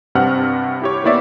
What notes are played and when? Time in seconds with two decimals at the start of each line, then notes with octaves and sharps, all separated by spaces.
0.15 G2 C3 C4 F#5 F6
0.82 E4 G4 C#5
1.04 A#3 B3 E4 C#5 D5 E5